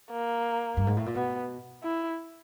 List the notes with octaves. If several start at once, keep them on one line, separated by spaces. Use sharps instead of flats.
A#3
G2
G#2
A2
A#2
B2 B3
E4